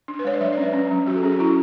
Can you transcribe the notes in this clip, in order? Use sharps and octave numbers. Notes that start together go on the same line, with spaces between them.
D4
B4
G#3 C#5
D5
F#3 E5
D5
C#4
B4
C#4
F#3
F#3 F#4
A4
C#4 G#4
F#4
C#4 E4